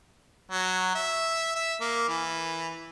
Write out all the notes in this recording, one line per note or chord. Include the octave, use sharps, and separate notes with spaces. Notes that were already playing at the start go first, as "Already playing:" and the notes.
F#3
E5
E5
A#3
E3